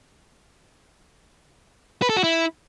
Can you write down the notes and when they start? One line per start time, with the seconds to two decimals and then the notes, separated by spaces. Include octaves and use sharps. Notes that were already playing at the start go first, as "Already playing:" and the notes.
2.02 B4
2.09 A4
2.17 F#4
2.24 E4